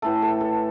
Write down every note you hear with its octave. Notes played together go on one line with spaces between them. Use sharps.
A2 E3 A3 A4
A4
A4